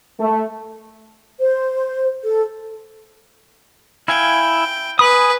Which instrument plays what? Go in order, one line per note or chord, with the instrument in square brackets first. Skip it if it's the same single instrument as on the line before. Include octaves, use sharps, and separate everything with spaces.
[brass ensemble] A3
[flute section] C5
A4
[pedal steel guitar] E4 F5 G#5 [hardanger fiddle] G5
[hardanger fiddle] B4 [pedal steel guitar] G#5 B5 D#6